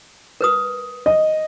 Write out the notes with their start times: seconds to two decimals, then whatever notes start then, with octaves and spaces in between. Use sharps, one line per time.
0.41 A#4 B4 D#6
1.06 D#5